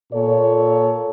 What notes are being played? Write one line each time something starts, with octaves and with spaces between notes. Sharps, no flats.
A#2 A4 C#5